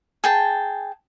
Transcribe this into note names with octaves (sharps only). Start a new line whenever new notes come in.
G#4 G5 A5